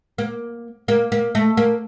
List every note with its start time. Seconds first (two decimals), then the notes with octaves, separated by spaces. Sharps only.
0.18 A#3
0.88 A#3
1.12 A#3
1.35 A3
1.57 A#3